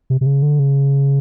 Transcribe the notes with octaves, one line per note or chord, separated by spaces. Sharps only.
C3
C3
C#3
D3
C#3